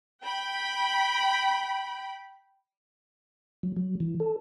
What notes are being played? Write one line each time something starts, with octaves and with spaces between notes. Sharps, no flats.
G5 B5
F#3
F#3
E3
A4